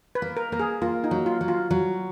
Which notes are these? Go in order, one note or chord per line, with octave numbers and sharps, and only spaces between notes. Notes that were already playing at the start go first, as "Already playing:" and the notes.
B4
A#3
A#4
A#3 A#4
G#4
A#3 F4
D#4
F#3
F4
F#3
F4
F#3